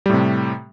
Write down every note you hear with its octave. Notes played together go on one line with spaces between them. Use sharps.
A2 C3 G3